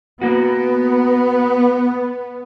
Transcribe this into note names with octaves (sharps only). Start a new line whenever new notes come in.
A#3 B3 F#4